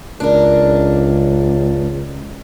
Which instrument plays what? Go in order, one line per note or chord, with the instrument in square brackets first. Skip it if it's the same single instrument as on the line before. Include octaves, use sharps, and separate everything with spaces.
[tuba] C#2 [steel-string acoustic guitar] D4 A#4